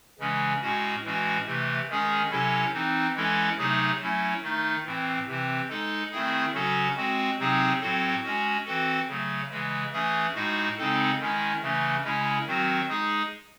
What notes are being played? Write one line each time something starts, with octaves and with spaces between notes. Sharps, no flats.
C#3 E3 G#3 C#4
A2 G#3 C#4 F#4
A2 E3 G#3 C#4 F#4
C3 E3 A3
D#3 G#3 C#4 G#4
C3 F#3 C#4 E4 A4
E3 C4 D#4
E3 G#3 C#4 E4 A4
C3 F#3 A3 D#4 G#4
F#3 A3 C#4 E4
D#3 A3 D#4
A2 E3 C4
C3 E3 C4
G#3 D#4 A4
D#3 A3 C4 E4 G#4
C#3 F#3 C#4 F#4 A4
G#3 C4 F#4
C3 F#3 C4 D#4 G#4
A2 F#3 C4 F#4 A4
G#3 C#4 F#4
E3 C4 F#4 A4
C#3 F#3 A3
C#3 E3 G#3
E3 A3 C#4 G#4
A2 G#3 D#4 F#4
C#3 G#3 C4 D#4 A4
D#3 G#3 C#4 E4
C#3 E3 A3 C#4
C#3 G#3 C#4 E4
D#3 F#3 C4 F#4
G#3 D#4 G#4